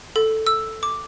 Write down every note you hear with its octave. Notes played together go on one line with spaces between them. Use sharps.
A4
E6
D6